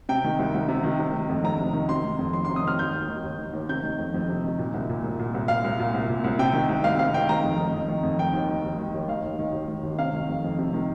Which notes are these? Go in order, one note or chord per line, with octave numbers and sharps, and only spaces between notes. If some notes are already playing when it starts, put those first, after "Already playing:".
C3 G5
D#3
C2
C2
C3
D#3
C3
D#3
F2
F2 A#5
C3
D#3
C3 C6
D#3
F2
F2 C6
C3 C6
D#6
D#3 F6
D#3 G6
D#2
D#3
D#2
D#3
D#2
C3 G6
D#3
F2
F2
C3
D#3
A#2
C2
A#2
C2
A#2
C2
A#2 F5
C2
A#2
C2
A#2
C2
C3 G5
D#3
C2
C2 F5
C3 F5
D#3 G5
D#3 A#5
F2
D#3
F2
D#3
F2
D#3 G5
D#2
D#3
D#2
D#3
D#2
D#3 F5
D#2
D#3
D#2
D#3
D#2
C3 F5
D#3
F2
F2
C3
D#3